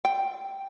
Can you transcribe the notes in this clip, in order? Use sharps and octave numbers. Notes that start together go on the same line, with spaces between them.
G5